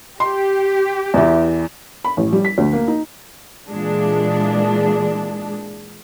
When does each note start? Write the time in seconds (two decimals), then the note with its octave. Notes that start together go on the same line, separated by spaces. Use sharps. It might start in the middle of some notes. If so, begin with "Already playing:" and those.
0.20 G4 C6
1.14 E2 E3
2.04 B5
2.17 A1
2.33 G3
2.45 B6
2.58 D2
2.73 A#3
2.88 D#4
3.70 A#2 E3 G#3 D4